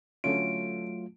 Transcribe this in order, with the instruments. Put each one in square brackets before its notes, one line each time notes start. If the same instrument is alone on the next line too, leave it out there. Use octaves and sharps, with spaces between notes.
[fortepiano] D3 C#4 [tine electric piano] F#3 A3 F4 [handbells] D7